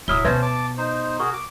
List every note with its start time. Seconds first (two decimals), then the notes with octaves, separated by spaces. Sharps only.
0.08 D1 F#3 E4 E5 D#6 F6 G7
0.25 B2 C#4 B4 C5 E5 A5 G#6
0.42 A5 D6
0.78 D#4 C5
1.20 F#4 G#4 A#4 C#6
1.33 D6